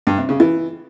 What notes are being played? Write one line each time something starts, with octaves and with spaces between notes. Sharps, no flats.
G2
C3
C#3
E3